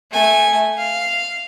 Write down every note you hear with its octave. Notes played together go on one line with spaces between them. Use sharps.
A3 G#5
F5